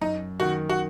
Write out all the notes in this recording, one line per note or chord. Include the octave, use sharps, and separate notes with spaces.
F#2 D#4
D#3 F#4
F#4